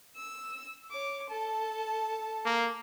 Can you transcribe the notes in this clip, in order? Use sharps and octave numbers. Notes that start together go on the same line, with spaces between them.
E6
C#5 D6
A4 A5
A#3